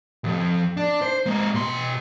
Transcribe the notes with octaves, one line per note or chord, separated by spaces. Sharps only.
C2 F2
D4
C5
G#3 A#3
B2 C6